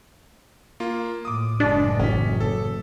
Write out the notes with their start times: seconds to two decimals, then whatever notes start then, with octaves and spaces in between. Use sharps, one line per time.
0.80 A#3 F4
1.25 A2 D6 D#6
1.60 F#1 A2 G#3 D4 D5
1.99 A1 C#4 B6
2.40 A4